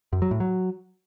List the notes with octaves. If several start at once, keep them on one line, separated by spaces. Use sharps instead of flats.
F#2
F#3
A2
F#3